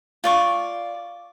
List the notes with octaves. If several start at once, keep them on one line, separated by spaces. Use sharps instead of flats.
F4 D5 C#6